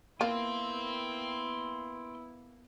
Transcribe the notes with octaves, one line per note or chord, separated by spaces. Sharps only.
A#3 B3 E4 F4 G5 C6